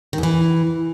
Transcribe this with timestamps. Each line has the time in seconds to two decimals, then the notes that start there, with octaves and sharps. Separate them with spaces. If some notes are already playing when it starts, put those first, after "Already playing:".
0.13 D#3
0.18 E2
0.23 E3